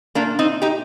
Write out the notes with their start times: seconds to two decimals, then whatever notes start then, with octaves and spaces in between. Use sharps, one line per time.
0.15 A#2 A#3 D4
0.39 C4 D#4
0.62 D#4 G4